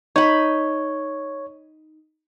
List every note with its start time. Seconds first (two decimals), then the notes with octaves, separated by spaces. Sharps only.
0.16 D#4 C#5 B5